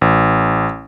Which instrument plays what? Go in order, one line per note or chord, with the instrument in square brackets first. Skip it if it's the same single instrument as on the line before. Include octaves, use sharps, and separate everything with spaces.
[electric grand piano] A1